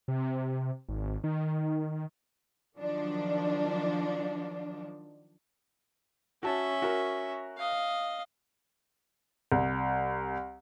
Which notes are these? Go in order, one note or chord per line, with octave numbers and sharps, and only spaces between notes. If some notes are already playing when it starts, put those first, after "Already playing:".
C3
G#1
D#3
D#3 F3 F#3 D4
C#4 F#4 E5 A5
F#4 A#4
D#5 F5
C2